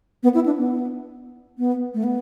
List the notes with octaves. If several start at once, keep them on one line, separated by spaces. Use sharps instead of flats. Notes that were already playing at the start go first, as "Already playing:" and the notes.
B3
E4
D4
B3
B3
A3
B3